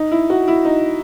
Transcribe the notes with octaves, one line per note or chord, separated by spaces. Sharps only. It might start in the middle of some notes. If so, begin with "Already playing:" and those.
Already playing: D#4
E4
F#4
E4
D#4